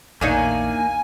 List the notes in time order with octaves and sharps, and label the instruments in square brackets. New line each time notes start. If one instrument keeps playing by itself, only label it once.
[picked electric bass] A#1 E2 [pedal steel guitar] A#3 [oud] D4 D#4 C#5 [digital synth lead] G#5